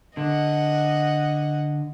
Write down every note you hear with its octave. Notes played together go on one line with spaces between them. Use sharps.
D3 D#5 F#5